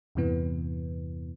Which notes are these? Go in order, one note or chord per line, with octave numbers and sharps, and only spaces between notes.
E2 G2 C3 E3 B3